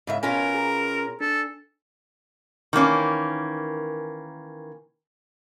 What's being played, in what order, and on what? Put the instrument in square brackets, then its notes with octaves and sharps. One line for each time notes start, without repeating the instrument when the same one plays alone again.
[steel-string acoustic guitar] G#2 C#3 E5
[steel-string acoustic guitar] B2 C#4 F4 [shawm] A#4 [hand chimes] G#5
[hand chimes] G#4 A#5
[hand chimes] D4 [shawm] A4
[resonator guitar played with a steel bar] D#3 E3 A#3 C#4